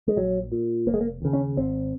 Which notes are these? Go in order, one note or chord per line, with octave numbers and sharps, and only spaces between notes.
G#3
A#1 F#3
A#2
F1 A#3
G#3
A#3
D#2 C#3
C#4
G#1 C4